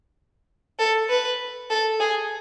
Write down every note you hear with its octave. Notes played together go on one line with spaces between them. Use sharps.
A4
B4
A4
G#4